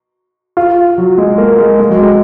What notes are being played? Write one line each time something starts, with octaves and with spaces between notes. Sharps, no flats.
F4
F#3
G#3
A#3
G#3
G#3
F#3
G#3